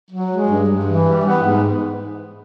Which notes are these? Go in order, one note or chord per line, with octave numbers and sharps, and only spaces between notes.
F#3
G#3
G2
G2
E3
G3
B3
G#2